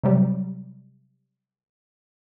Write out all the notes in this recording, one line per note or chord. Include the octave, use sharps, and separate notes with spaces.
C3 F#3 G3